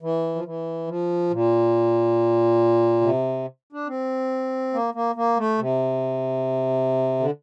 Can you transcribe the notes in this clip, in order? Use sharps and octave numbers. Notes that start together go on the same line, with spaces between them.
E3
F3
E3
F3
A#2
C3
D4
C4
A#3
A#3
A#3
A3
C3
D3